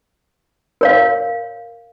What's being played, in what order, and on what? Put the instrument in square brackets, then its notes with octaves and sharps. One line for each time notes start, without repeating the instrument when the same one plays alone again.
[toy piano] A#4 C#5 F5